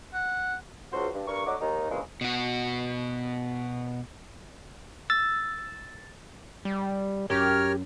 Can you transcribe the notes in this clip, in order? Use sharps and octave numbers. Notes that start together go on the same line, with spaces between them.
F#5
C#2 F#4 C5
G2
G2 A#4 C#6
D3 F#3 D#5 C#6 D6
D#2 D#3 D#4
G2 A#2 C#3 E3 F3 G#3
B2 F#4
E6 A6
G3
F#2 G4 A#4 C#5 F6